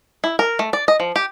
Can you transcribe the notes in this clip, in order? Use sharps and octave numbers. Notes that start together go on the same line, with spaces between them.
E4
A#4
A3
D5
D#5
F3
G4